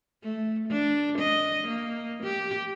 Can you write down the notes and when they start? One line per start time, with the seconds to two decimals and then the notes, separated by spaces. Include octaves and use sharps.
0.23 A3
0.69 D4
1.19 D#5
1.68 A#3
2.23 G4